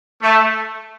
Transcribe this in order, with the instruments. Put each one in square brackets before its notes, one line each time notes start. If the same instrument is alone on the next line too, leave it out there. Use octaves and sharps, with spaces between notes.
[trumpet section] A3